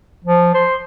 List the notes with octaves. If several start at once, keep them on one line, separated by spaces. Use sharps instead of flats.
F3
C5